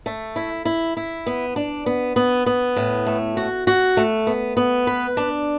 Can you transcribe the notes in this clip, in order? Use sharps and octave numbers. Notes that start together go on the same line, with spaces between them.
A3
E4
E4
E4
B3
D4
B3
B3
B3
A2
A3
F#4
F#4
A3
B3
B3
B4
D4